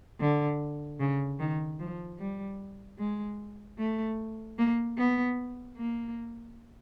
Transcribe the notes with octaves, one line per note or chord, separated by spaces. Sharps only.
D3
C#3
D#3
F3
G3
G#3
A3
A#3
B3
A#3